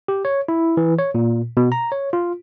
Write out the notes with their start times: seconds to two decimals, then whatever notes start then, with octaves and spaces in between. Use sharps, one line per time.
0.08 G4
0.25 C#5
0.48 E4
0.77 E3
0.99 C#5
1.14 A#2
1.57 B2
1.72 A#5
1.92 C#5
2.13 F4